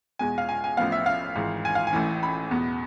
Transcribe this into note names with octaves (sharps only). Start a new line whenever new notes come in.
E2 B2 G#3 G#5
F5
G#5
G#5
A1 A2 F3 B3 F5
E5
F5
G#1 G#2 E3
G#5
F5
G#5
A1 A2 E3
B5
E2 B2 B3